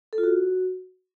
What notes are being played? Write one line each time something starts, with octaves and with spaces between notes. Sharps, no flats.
A4
F4
F#4